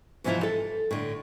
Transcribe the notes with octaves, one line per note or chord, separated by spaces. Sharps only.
G#2 C3 E3 F3 E4 F4
A4
A2 D3